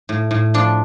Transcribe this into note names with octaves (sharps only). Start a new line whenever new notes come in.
A2
A2
F3 D4